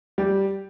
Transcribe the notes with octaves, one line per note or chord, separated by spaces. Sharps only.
G3 G4